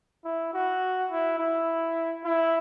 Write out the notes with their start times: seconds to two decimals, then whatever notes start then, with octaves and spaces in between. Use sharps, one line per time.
0.25 E4
0.54 F#4
1.11 E4
1.39 E4
2.25 E4